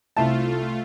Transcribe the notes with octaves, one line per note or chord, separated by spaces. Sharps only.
C2 A3 F4 E5 A5